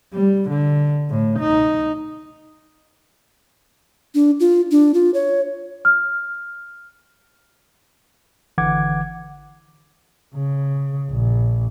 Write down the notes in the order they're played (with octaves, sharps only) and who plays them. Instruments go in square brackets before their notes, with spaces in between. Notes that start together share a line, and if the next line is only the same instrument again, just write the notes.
[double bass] G3
D3
A2
D#4
[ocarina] D4
F4
D4
F4
C#5
[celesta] F6
[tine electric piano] G#1 D3 E3 F#5 D6 G#6
[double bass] C#3
A#1